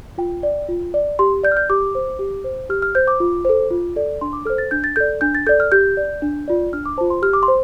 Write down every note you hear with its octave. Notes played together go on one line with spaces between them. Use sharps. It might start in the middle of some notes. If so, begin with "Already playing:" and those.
F4 G5
D5
F4
D5
G4 C6
D5 G6
F6
G6
G4 D6
C5
G4
C5
G4 F6
F6
C5 G6
D6
F4
A4 C5
F4
A4 D5
D4 C6
D6
A4 C5 F6
A6
D4 G6
A6
A4 D5 G6
D4 G6
A6
A4 D5 G6
F6
G4 G6
D5
D4
F4 D5
D4 F6
D6
F4 C5 A5
C6
G4 F6
D6
C6
C5